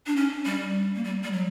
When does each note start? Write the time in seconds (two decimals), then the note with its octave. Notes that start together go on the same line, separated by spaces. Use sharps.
0.07 D4
0.16 C#4
0.45 G3
0.96 A#3
1.04 G3
1.23 G3
1.33 F#3